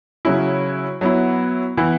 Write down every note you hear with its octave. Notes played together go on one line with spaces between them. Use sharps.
C#3 F#3 C#4 E4
F#3 B3 E4
E3 B3 E4